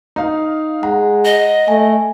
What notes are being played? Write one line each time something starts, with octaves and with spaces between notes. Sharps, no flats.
D#4 F5
G#3 F#5 A#5
D#5
A3 G#5